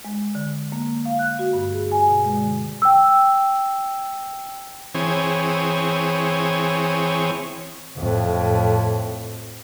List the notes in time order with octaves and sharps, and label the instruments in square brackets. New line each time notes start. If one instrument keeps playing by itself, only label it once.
[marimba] G#3
D3
A#3
F5
F#6
F#4
G2
G#4
G#5
B2
G#3
D3
[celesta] G5 E6
[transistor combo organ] E3 C4 G#4 C#5
[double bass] F2 A2